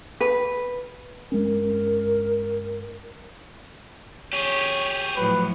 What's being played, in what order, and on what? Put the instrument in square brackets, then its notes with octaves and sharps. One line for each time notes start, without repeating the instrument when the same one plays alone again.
[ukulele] B4
[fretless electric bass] G2 G#3 C#4 [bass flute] A#4
[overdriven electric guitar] G4 G#4 [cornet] C#5
[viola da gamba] A2 F3 F#3 [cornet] B4